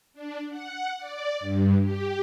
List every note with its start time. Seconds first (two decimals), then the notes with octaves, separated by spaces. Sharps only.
0.14 D4
0.50 F#5
0.98 D5
1.40 G2
1.81 G4